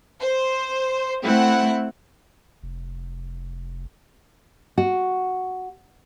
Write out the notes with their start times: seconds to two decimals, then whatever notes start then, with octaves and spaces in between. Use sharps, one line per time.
0.20 C5
1.24 A3 C4 E4 F#5
2.63 F1
4.78 F#4